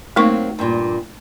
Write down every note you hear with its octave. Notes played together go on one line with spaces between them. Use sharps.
F#3 A3 A#3 C4 D#4 C#6
G2 A#2